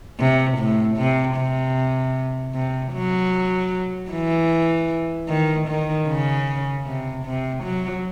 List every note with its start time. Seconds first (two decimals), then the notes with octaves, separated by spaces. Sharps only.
0.19 C3
0.58 A2
0.97 C3
1.37 C3
2.55 C3
2.93 F#3
4.11 E3
5.29 D#3
5.68 D#3
6.08 C#3
6.86 C3
7.25 C3
7.64 F#3